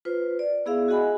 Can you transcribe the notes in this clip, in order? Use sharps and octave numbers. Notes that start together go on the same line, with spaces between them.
F4 B4 C5
D5
B3 E4 G#4 E5 F5
F#4 G#4 D#5 F#5 G#5 B5